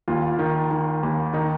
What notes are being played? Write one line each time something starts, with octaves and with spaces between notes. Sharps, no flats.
D#2 F4
D#3
D#3
D#2
D#3 D#4